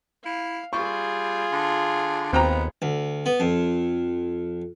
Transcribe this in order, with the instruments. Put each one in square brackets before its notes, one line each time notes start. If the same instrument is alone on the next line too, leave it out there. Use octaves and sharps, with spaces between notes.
[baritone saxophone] E4 [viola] F5
[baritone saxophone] G3 [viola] F4 G#4 [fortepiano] C#6
[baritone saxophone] D3
[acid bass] D#2 [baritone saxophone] B3 [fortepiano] C4 G5 A#5
[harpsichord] D2
B3
F2